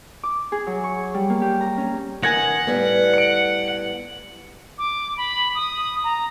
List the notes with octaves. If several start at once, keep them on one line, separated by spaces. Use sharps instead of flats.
D6
G#4
F#3
C#6
G3
A#3
G4
A#5
C#4
D#3 F#5 G#5 G#6 A#6
A2 G3 B3
C#7 D7
D6
B5
D#6
A#5